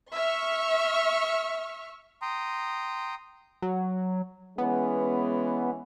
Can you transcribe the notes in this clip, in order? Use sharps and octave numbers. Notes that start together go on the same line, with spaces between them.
E5 C#6 F6
G5 A#5 C6 D#6
F#3
E3 G#3 B3 C#4